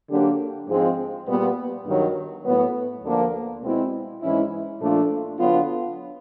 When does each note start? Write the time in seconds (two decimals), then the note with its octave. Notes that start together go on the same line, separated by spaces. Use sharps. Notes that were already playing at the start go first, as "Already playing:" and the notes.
0.09 D3 F#3 A#3 D4 G4
0.68 G#2 F3 G#3 C4 F4
1.27 A#2 G3 B3
1.86 G2 D#3 F#3
2.45 A2 F#3 B3
3.03 D2 D3 F3 A#3 D4
3.62 B2 G#3 C4 E4
4.21 G#2 E3 G#3 C#4 E4
4.80 A#2 F3 A3 D4 F4
5.38 D3 F#3 B3 D4 F4